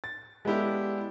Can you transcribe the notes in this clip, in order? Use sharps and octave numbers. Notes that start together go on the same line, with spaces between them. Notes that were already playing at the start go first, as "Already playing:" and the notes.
A6
G#3 B3 D4 E4 G4 A4